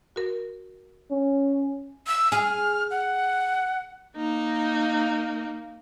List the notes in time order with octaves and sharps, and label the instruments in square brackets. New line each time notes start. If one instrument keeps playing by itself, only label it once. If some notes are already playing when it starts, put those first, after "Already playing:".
[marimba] F#4 A#4
[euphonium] C#4
[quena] E6
[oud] G#4 [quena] F6
[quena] F#5
[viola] A#3 D#4